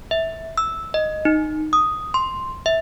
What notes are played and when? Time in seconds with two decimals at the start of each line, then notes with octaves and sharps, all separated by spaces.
0.11 E5
0.58 E6
0.94 D#5
1.25 D#4
1.73 D#6
2.14 C6
2.66 E5